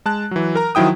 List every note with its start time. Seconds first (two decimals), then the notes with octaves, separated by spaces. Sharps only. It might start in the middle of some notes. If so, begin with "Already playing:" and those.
0.06 G#3 A5 F#6
0.31 E3 F#3
0.55 A#4 A#5
0.75 D#3 F3 F#3 E4 G5 D#6